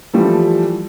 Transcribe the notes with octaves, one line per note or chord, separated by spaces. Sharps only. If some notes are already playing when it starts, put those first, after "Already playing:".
E3 F3 G3 A3